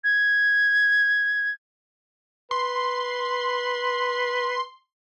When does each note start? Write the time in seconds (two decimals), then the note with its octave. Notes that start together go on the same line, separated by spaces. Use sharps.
0.04 G#6
2.51 B4 C6